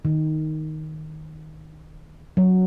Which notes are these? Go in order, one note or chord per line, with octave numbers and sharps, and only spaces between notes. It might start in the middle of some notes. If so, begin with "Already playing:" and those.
D#3
F#3